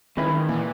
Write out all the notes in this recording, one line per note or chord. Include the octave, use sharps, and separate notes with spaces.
D#3 G#3 C#4 E4 B4
A#2 E3